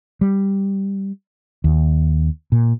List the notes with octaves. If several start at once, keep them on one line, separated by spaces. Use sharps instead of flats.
G3
D#2
A#2